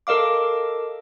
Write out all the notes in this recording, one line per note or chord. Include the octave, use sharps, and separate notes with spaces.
A4 A#4 D#5 F5 D6